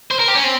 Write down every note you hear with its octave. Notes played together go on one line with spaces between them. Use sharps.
C5
A#4
G4
C#4
C4